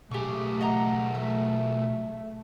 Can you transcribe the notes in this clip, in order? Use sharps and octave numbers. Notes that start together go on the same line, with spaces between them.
B1 A3 G4 G#4 C#6
D#5 F#5 A#5
E5